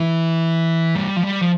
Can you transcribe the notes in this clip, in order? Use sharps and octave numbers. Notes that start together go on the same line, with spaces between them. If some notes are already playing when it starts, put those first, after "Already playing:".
Already playing: E3
G3
F3
G3
F3